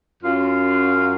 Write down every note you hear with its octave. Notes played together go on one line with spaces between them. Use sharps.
F#2 F4